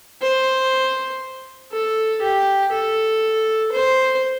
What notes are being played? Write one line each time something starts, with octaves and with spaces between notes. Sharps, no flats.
C5
A4
G4
A4
C5